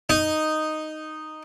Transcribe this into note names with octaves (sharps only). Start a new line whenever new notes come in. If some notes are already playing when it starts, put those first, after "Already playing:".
D#4